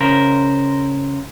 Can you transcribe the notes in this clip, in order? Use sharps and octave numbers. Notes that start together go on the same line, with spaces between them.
C#3 A#4 C5